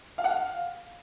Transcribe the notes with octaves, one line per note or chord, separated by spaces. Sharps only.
F5
F#5
F5